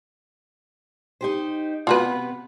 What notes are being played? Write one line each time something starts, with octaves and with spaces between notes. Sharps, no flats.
D#4 G4 C5
C3 B3 F4 F#4 B4